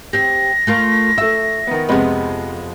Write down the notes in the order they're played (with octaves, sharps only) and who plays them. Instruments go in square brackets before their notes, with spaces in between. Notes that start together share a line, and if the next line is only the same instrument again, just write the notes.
[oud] C4 G4 [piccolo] A#6
[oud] A3 F4 A#4
[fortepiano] A3 E6 [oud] E5
[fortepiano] D#3 B3
[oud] F2 B4 [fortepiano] C3 G#3 B3